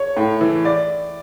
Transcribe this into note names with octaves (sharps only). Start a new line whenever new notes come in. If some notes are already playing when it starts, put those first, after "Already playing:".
Already playing: C#5
A2
E3
D5